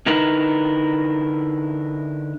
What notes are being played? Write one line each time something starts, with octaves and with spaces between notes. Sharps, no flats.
D3 D#4 E4 A#4 B4